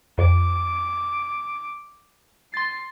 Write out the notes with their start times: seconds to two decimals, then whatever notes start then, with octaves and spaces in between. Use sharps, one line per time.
0.18 F2 D6
2.54 C6 A6 C7